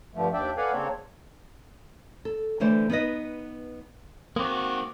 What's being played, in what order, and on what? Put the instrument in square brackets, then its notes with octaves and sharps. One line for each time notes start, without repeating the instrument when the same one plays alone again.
[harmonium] G2 D3 F3 A3
D#2 D4 D5 E5 G5
A4 B4 D5 F5 F#5 G#5
C#3 A#3 C4 D4 A4 C#5
[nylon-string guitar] A4
D3 E3 A3 C5 D5
B3 D#4 B4 D#5
[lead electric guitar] D#3 G#3 [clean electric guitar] A#3 C4 [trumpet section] F#4 [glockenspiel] D6 D#6